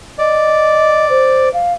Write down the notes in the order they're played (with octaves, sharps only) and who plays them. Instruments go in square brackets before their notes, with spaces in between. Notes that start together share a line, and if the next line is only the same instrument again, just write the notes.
[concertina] D5 [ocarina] D#5
[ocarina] C5
F5